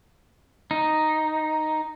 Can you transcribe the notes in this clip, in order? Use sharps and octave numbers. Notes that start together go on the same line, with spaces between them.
D#4